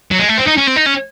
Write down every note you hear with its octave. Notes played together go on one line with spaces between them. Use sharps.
F#3
G#3
A3
C4
D#4
C#4
C4
D#4
C#4